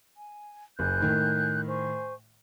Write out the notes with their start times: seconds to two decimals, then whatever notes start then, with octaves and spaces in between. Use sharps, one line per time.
0.17 G#5
0.79 F#1 G#5 F#6 G6
1.01 A2 D#3
1.67 C5 G#5 C#6